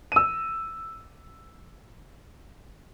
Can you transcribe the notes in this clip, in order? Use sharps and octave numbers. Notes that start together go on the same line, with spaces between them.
E6 D#7